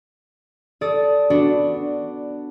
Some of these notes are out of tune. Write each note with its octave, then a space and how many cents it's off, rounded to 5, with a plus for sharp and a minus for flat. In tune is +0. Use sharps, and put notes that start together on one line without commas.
A4 +0 D5 -10 D#6 +15
B3 +0 D4 +0 F#4 +0